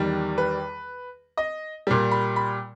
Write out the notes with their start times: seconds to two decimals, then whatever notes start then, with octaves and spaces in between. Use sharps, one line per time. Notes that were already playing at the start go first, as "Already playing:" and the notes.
Already playing: E2 D#3 G3
0.38 B4
1.37 D#5
1.87 A#2 G3
2.11 B5
2.36 B5